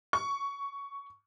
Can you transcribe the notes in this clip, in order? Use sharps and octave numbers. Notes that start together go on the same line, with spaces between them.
C#6